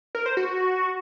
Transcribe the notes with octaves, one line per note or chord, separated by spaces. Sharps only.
A#4
C5
F#4